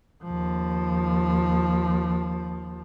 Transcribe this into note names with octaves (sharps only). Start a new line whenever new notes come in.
D#2 F3